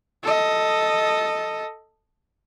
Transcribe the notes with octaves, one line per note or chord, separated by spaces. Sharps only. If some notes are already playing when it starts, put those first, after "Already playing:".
A4 D#5